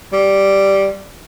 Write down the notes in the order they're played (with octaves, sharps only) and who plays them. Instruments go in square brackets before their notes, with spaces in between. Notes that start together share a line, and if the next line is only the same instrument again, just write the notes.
[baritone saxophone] G3